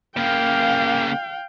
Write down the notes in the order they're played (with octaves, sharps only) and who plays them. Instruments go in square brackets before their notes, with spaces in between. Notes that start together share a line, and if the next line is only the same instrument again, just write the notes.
[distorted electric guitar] C#3 A#3 [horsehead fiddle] F5 G5